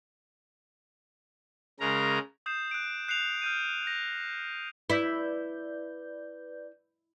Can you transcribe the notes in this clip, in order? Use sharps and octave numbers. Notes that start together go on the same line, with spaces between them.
C#3 G#3 A#4 A#5
D#6 G6 C7 E7
F#6 D7
F#6 C7 C#7 E7 F7
F6 G6 D#7
G6 A#6
E4 B4 D5 G6